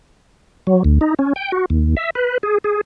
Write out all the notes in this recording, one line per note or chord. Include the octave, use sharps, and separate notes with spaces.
F#3
D2
D#4
C#4
G5
F#4
D#2
E5
B4
G#4
G#4